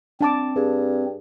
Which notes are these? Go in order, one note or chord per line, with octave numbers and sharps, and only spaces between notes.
C4 D4 A5 D6
G2 G#4